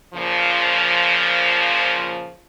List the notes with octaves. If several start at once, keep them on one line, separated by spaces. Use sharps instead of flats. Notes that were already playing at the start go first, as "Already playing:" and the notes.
A#2 C#3 F3